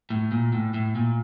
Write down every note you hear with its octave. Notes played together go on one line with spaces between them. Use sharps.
A2
A#2
A2
A2
A#2